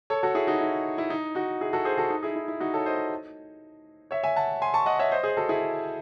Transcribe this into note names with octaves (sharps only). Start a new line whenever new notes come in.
A4 C#5
F#4 A4
E4 G#4
D#4 F#4
E4
E4
D#4
D#4 F#4
E4 G#4
F#4 A4
G#4 C5
F#4 A4
D#4
E4 G#4
E4
E4
D#4 F#4
A4 C#5
C5 D#5
C#5 E5
E5 G#5
F#5 A5
G#5 C6
A5 C#6
D#5 F#5
C#5 E5
C5 D#5
G#4 C5
F#4 A4
E4 G#4